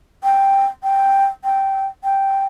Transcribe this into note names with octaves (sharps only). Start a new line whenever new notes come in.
G5
G5
G5
G5